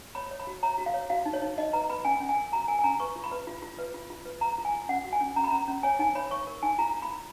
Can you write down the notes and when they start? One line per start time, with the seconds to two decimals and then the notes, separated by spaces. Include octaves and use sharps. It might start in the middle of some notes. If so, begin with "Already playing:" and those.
0.15 C#5 B5
0.31 C#5
0.40 B5
0.47 F#4
0.63 C#5 A#5
0.78 F#4
0.86 F5
0.94 C#5
1.10 F#4 F5
1.25 D#4
1.33 C#5
1.42 D#4
1.58 D#4 D#5
1.73 B4 A#5
1.90 B4 B5
2.05 C#4 G#5
2.20 C#4
2.29 G#5
2.37 A#4
2.53 F#4 A#5
2.68 A#4 G#5
2.79 G#5
2.83 C#4 A#5
3.00 B4 C#6
3.16 F4
3.24 B5
3.32 B4
3.47 F4
3.62 F4
3.79 B4
3.94 F4
4.10 F4
4.26 B4
4.41 B4 A#5
4.58 F4
4.65 G#5
4.73 F4
4.88 C#4 F#5
5.05 F#4
5.13 G#5
5.20 C#4
5.36 C#4 A#5
5.44 B5
5.50 C#4 A#5
5.68 C#4
5.83 C#5 G#5
5.99 D#4 G#5
6.15 C#5 B5
6.31 C#5 C#6
6.47 A#4
6.63 D#4 G#5
6.78 F4 A#5
6.94 F4
7.02 B5
7.10 F4